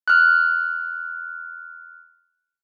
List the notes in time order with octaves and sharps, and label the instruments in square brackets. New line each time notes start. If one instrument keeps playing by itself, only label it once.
[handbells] F6 F#6